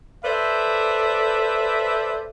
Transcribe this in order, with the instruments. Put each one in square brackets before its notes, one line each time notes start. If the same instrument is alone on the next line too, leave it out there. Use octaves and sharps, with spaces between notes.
[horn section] A4 B4 C5 D5 E5